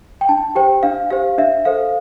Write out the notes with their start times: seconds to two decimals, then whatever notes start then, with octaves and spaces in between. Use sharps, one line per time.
0.21 G5
0.29 D4 A5
0.55 G4 C5 G5
0.83 D4 F5
1.11 G4 C5 F5
1.38 D4 E5
1.65 A4 C5 F5